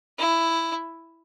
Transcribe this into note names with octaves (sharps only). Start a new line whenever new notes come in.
E4